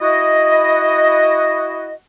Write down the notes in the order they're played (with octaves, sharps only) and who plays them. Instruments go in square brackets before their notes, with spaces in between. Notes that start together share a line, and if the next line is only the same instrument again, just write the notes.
[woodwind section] E4 F#4 D#5